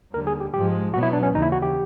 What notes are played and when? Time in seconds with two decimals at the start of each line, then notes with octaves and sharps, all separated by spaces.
0.14 D#2 D3 G3 A#4
0.27 G#4
0.40 G4
0.53 G#2 F3 G#3 G4
0.94 B2 F#3 B3 F#4
1.03 E4
1.13 D4
1.23 C#4
1.33 D#2 C#3 E3 D#4
1.42 E4
1.52 F#4
1.62 G4